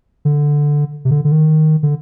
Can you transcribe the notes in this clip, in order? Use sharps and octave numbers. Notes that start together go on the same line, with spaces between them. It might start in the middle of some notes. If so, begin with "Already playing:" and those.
D3
C3
D3
D3
D#3
D3